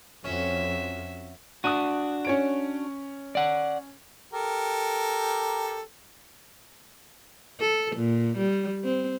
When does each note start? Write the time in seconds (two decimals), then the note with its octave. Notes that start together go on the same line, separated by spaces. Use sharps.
0.24 F2 C#4 F#4 E5
1.64 D4 F#4 D#6 F#6 D#7
2.25 C#4 C#5 D7
3.35 D5 F#5
4.33 G4 A4 A#4
7.60 A4
7.96 A#2
8.38 G3
8.85 C4